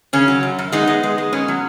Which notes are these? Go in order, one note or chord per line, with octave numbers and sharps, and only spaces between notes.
C#3 C#4
F#3
F#2
F#2
G#3 B3 D#4
G#3
G#3
G#3
B2 C#4
F#3